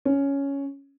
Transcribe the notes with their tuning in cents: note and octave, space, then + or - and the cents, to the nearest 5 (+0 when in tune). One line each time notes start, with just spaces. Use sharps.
C#4 +5